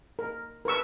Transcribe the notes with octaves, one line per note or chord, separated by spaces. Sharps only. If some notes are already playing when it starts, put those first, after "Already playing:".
A#4
A#4 B4 C#6 E6